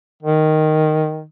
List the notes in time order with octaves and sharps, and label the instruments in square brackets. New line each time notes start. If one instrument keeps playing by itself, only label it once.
[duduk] D#3